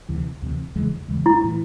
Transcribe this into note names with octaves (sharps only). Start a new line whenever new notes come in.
D2 C3 E3
D2 C3 E3
E2 C#3 E3 G#3
E2 C#3 E3 G#3
E4
A2 E3